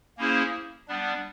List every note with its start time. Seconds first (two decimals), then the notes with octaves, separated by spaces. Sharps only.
0.17 A#3 C#4 E4 G#4 C5
0.88 G3 B3 D4